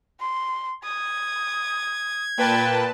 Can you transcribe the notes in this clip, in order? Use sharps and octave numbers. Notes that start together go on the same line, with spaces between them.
C6
D#6 G#6
A#2 B4 G5 A5